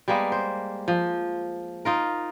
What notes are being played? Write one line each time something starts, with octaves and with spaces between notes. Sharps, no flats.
G3 G#3 A#3 B3
C5
F3
D#4 F4 A#4